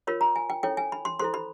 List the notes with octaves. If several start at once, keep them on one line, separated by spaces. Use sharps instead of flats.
F4 A#4 C#5 B5
A#5
G#5
G5
C#4 E4 A4 C#5 G5
G#5
B5
C6
E4 A4 C5 C6
B5